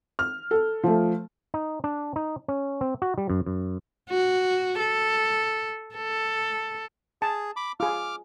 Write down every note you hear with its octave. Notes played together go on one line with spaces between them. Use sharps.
F6
A4
F3 A3
D#4
D4
D#4
C#4
C4
F#4
G3
F#2
F#2
F#4
A4
A4
G#4 A5
B5 D6
F4 G#4 D6 F6